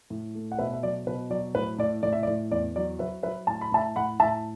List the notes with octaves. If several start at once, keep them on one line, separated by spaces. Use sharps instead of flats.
A2
A3
F#5
B2 B4 E5
E5
F#3 D5
B2 B4
F#3 D5
A2 B4
A2 D5
A2 D5
E5
D5
A2
E2 D5
F#3 D5
F#3 B4 E5
F#3 B4 E5
A2 A5
B5
A2 E5 A5
A2 F#5 B5
A2 E5 A5